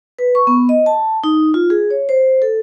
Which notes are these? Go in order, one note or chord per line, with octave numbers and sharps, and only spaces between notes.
B4
C#6
B3
D#5
A5
D#4
F4
G#4
C#5
C5
A4